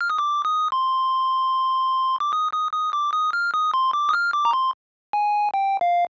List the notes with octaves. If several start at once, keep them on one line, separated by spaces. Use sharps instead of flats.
F6
D#6
D6
D#6
C6
D6
D#6
D#6
D#6
D6
D#6
F6
D#6
C6
D6
D#6
F6
D6
A#5
C6
G#5
G5
F5